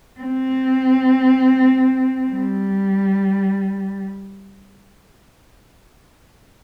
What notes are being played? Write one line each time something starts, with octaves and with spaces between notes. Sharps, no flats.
C4
G3